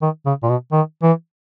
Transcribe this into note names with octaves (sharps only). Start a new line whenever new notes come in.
D#3
C#3
A#2
B2
D#3
E3